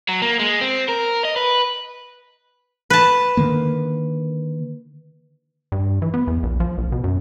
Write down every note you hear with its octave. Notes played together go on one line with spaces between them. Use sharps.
F#3
A#3
G#3
C4
A#4
D#5
B4
B4 A5
D3 D#3 A#3
G2
E3
B3
E2
A#1
F3
A#1
B2
F#2